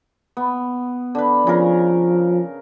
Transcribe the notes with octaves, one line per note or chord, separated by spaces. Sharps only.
B3
D3 B4
C#3 F3 A#4